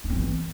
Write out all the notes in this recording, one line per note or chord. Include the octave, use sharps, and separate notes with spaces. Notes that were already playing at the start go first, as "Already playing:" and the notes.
D4
C4
E3